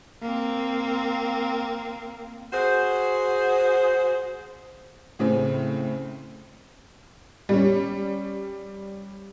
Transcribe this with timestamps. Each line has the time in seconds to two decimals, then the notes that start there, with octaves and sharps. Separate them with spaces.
0.22 A#3 C4
2.53 F#4 G#4 C5
5.19 A2 C#3 C4
7.49 G3 C#4